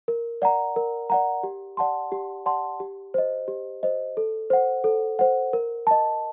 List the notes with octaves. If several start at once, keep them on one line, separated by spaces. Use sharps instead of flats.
A#4
D5 F#5 A#5
A#4
D5 F#5 A#5
G4
D5 F#5 A5 C6
G4
D5 F#5 A5 C6
G4
C5 D#5
G4
C5 D#5
A4
C5 F#5
A4
C5 F#5
A#4
D#5 A5